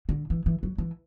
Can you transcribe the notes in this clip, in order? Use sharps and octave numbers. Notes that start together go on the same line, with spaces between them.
D3
E3
E3
F#3
E3